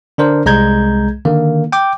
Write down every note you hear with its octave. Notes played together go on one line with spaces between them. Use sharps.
D3 D4 A#4 C5
C2 G#3 A#5 G6 G#6
D3 D#3 A#3
G5 D6